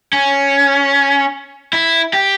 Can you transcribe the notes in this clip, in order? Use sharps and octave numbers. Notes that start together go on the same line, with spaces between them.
C#4
E4
G4